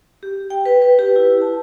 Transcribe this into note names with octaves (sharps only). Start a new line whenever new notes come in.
G4
G5
B4
B4
G4
E4
A5